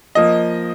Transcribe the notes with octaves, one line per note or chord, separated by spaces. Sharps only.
F3 A#3 D#5